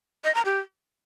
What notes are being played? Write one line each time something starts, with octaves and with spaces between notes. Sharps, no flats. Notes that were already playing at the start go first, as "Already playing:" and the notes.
D#5
A#5
G4